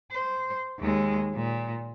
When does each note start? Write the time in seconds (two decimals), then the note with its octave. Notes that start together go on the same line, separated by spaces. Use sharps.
0.11 C5
0.79 D#2 G#3
1.35 A#2